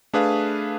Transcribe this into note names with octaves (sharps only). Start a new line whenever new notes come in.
A3 D4 G#4 B4 F5